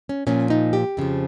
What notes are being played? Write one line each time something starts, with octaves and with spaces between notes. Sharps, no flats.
C#4
A#2 F3 C#4
D#4
G4
F2 C#3 F3